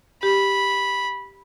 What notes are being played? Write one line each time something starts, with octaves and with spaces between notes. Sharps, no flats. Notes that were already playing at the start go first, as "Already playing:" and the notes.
G4 B5